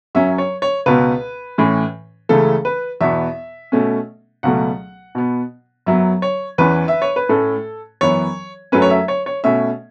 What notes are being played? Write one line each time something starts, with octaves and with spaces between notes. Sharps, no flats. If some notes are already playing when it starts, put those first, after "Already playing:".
F#2 F#3 C#4 E5
C#5
C#5
C#2 B2 B3 B4
A2 E3 C#4
C#2 C#3 E3 A3 A4
B4
E2 B2 B3 E5
B2 A3 C#4
C#2 B2 F#3 A3 F#5
B2 B3
F#2 F#3 B3 E5
C#5
E2 E3 C#4 B4
E5
C#5
B4
A2 A3 C#4 A4
F#2 E3 B3 C#5
F#2 F#3 A3 C#4 B4
C#5
E5
C#5
C#5
B2 A3 C#4 E5